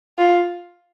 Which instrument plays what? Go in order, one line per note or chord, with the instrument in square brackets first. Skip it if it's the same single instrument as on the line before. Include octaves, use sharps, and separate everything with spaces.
[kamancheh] F4